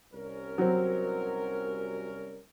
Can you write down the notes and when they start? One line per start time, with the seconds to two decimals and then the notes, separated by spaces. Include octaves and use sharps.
0.13 C2 C#4 A#4
0.58 F#3 C4